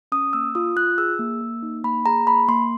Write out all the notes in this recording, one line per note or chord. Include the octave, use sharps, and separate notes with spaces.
C#4 D#6
A#3 E6
F4 D#6
F4 F#6
G#4 E6
A#3
A#3
D#4
A#3 B5
G#4 A#5
A#3 B5
A#3 C6